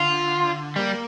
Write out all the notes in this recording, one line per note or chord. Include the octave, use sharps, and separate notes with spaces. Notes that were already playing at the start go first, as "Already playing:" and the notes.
Already playing: D3 F4
G3 A#3